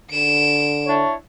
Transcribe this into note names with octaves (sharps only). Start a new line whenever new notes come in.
D3 D7 E7
D4 E4 C#5